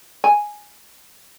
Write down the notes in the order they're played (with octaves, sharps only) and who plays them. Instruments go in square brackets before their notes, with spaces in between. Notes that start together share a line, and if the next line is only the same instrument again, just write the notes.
[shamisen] G#5